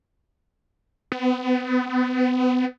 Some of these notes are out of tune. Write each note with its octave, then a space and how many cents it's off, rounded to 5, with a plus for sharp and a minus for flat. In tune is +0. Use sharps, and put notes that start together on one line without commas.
B3 +35